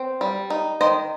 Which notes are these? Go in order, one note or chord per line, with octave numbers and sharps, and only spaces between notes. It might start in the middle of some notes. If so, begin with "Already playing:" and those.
Already playing: C4
G3
D#4
D#3 C5 D#5